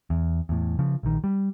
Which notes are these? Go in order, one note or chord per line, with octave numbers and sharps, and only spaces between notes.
E2
E2 A2
C#3 F3
A#1 D#3
G3